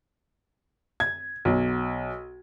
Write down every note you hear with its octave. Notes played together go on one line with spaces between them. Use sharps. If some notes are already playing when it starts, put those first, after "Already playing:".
G#6
B1